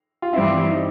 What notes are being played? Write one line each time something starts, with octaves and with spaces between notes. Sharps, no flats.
F4
G2 E3 G3 C4 E4
D#4